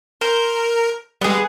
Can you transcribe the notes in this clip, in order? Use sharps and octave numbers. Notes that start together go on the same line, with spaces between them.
A#4 C5
G3 G#3 B3 G#4